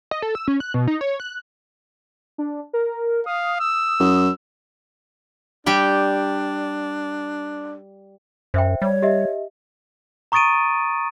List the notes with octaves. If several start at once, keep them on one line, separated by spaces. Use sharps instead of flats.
D#5
A4
E6
C#4
F#6
B2
D#4
C#5
F#6
D4
A#4
F5 D#6
E6
F#2
G3 D4 G4 G5
F#2 C5 E5 G5
G3 C#5
G4 D#5 E5
A#5 C#6 D#6 A6 D7 D#7